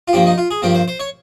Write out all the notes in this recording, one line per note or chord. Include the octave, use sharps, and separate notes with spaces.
F4
G2 F3 A#3 G4
D#4
F4
G#4
G2 F3 A#3 G4
C5
C5
C#5